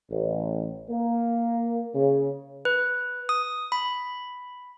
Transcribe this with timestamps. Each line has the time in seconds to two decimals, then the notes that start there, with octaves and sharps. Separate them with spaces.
0.11 A1
0.90 A#3
1.95 C#3
2.65 B4
3.29 D#6
3.72 B5